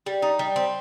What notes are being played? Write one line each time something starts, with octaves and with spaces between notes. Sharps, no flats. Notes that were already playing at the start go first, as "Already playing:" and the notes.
G3
D#4
G3
C4